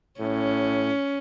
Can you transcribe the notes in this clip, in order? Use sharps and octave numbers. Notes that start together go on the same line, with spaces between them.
A2 C#4